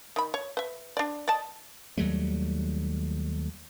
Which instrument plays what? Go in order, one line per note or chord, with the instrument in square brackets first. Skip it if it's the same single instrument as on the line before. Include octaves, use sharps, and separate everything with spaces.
[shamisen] D#3 B5
C#5
B4 E5
D4 D5
D5 D#5 A5
[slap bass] D#2 F#3 G3 A3